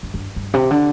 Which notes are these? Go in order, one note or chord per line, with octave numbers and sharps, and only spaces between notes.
G2
G2
G2
C3
D3